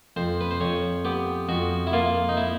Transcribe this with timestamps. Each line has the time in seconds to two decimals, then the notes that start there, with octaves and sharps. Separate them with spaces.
0.16 F2 C5
0.41 B4
0.51 C5
0.61 F2 C#5
1.05 B3 G4
1.49 F2 F#4
1.87 E4
1.93 A#3 F4
2.29 D#4
2.37 E4